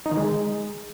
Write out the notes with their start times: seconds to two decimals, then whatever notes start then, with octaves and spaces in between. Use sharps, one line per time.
0.06 D#4
0.11 D#3
0.17 G#3